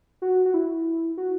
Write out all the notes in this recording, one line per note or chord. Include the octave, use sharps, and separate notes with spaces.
F#4
F#4
E4
F#4